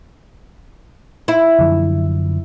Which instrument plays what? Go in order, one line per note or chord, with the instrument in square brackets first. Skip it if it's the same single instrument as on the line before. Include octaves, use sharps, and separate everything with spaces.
[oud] E4
[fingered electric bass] F#2 D3 F3